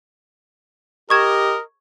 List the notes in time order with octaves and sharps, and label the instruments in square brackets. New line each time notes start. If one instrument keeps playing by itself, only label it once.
[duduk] G4 [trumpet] A#4 [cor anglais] D#5 [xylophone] C#6 G#6 E7